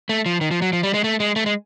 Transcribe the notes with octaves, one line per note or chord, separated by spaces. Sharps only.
A3
F3
D#3
F3
F#3
F3
G3
G#3
A3
G#3
A3
G#3